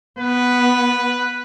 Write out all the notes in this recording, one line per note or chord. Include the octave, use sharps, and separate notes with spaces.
B3 B4